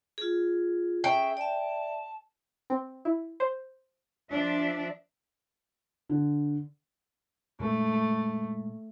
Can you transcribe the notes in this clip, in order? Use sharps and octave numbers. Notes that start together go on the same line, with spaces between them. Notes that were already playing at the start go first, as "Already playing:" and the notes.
F4 G#4
C#4 G#4 E5 G5
D5 E5 A5
C4
E4
C5
F3 D4 E5
D3
A#2 G#3 A3